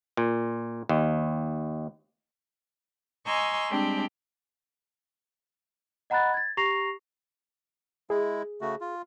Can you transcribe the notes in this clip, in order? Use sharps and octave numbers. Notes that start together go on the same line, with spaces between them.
A#2
D#2
D#5 G#5 A#5 C6 C#6 E6
G3 G#3 C4 D4 G4
D#5 F#5 A#5 B5 F#6 A6
G#6 A6
G4 A#5 C#6 A#6 C7 F7
G#3 E4 G#4
C#3 A3 F#4
F4